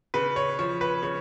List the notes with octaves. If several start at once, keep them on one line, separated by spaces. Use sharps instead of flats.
C#3 B4
C#5
F3 C#5
B4
C#3 C#5